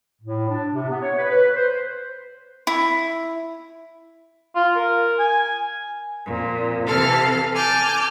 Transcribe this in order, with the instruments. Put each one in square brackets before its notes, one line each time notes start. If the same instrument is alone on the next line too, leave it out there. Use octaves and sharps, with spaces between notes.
[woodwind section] A2
D4
C3
B3
C#5
B4
B4
C5
[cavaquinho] E4
[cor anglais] F4
A#4
G#5
[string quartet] F2 A#2
C3 E3 A4 F5 F6
G#5 A5 D6 F6 G6